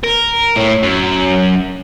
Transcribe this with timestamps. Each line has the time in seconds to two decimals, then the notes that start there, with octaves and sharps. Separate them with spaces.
0.04 A#4
0.56 A2
0.83 F#2